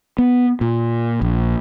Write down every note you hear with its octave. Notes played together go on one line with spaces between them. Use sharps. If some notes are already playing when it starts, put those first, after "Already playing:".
B3
A#2
A#1